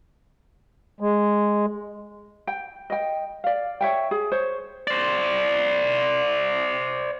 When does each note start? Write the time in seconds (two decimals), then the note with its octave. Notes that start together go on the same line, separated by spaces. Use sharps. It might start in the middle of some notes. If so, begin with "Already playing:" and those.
1.00 G#3
2.47 G5
2.90 D#5 G5
3.44 D5 F5
3.81 C#5 E5 G5
4.11 G#4
4.32 C5 C#5
4.87 C5 D5